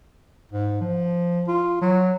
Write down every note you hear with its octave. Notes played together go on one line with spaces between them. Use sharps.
G#2
F3
F4
F#3